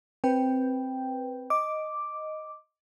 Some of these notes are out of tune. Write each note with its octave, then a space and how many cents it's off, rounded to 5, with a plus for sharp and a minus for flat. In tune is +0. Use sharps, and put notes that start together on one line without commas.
C4 +0 B4 +0 G5 +0
D#5 +0 D6 +0